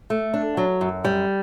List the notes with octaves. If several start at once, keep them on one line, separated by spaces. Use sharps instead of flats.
A3
D4
F#3
F#2
G3